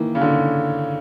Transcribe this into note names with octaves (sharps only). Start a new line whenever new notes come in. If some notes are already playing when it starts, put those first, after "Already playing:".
Already playing: D#3 E3 A#3
C#3
D3